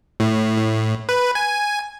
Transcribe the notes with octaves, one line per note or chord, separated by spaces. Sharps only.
A2
A2
B4
G#5